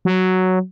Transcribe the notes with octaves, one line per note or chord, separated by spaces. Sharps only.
F#3